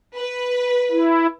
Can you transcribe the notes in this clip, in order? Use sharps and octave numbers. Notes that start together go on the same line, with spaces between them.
B4
E4